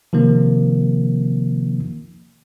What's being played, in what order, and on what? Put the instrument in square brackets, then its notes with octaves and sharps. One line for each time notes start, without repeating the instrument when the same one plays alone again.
[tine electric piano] C3 D#3 F3 A#3